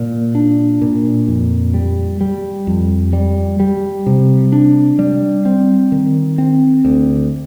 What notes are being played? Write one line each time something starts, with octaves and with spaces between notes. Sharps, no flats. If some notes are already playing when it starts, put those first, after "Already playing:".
Already playing: A#2
D4
A#2
F2
G3
G3
F2
G3
G3
C3
D4
G3
C4
D#3
C4
D2